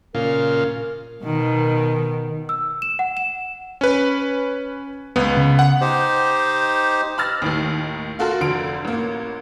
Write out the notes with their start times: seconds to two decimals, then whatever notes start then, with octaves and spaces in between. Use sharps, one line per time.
0.15 A#2 C#3 F4 A#4
1.24 B2 D#3
2.49 E6
2.82 E7
2.99 F#5
3.17 E7
3.81 C#4 B4
5.16 C#2 B3
5.37 C#3
5.59 F#5
5.81 D#4 G4 C5
7.18 B5 E6 F6 A6 A#6
7.42 D#2 A2 D#3
8.19 F4 F#4 A4 A#4
8.40 F1 D2 D3 F4 D7
8.85 A1 A#3